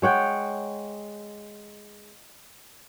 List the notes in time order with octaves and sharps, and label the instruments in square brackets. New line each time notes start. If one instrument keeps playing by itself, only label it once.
[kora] G#3 C#5 F#5 G5